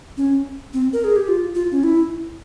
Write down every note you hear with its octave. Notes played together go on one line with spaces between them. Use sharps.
C#4
C4
A#4
G#4
G4
F4
F4
C#4
E4